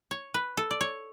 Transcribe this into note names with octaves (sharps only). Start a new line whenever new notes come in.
C#5
B4
A4
D5
C#5